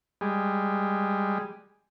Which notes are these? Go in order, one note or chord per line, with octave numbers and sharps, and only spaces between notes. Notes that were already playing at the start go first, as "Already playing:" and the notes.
G3 G#3